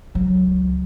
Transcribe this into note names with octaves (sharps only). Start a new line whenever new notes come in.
C#2 F#3